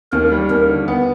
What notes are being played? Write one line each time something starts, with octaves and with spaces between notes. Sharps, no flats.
D#2 A#4
G3
D#2 A#4
D3
B3